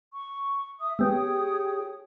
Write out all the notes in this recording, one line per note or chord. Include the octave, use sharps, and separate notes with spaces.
C#6
E5 D#6
G#3 B3 G4 G#4 C#5 G5 D#6